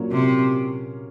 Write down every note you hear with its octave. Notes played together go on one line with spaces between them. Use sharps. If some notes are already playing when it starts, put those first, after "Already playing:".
Already playing: A#2 F#3 A#3 C#4
C3